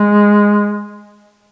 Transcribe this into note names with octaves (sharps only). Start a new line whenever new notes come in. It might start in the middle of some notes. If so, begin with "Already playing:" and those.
Already playing: G#3